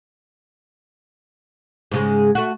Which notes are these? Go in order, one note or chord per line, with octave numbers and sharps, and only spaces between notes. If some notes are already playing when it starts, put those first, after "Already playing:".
G#2 C#3 G#3
A3 F#4